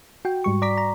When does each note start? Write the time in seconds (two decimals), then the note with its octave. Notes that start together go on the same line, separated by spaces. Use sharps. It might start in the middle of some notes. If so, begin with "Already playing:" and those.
0.25 F#4 G5
0.44 G#2 G3 C#6
0.62 D5 A#5 D6 B6
0.78 A#5